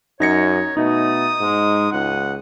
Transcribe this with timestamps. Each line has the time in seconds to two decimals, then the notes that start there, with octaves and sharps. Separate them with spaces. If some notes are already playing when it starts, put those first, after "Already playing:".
0.20 F#2 D#4 C#5 A#6 C#7
0.77 B2 A3 D#4 D#6
1.40 G#2 G#3
1.92 C#2 F#5